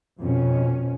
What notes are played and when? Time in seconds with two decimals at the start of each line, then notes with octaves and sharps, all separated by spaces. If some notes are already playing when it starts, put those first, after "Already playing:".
0.21 F2 B2 C#4